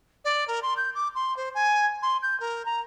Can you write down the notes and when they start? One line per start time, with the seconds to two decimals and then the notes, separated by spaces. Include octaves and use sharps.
0.25 D5
0.48 A#4
0.62 C6
0.77 G6
0.95 D6
1.15 C6
1.37 C5
1.55 G#5
2.02 C6
2.22 G6
2.40 A#4
2.65 A#5